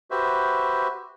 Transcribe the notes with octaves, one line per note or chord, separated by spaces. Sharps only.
F#4 G4 B4 C5 E5